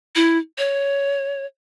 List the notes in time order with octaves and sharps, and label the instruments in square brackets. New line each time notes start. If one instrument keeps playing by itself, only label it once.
[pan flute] E4
C#5